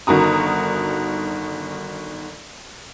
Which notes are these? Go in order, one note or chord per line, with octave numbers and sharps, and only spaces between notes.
G1 D#3 F#4 A#5 D#6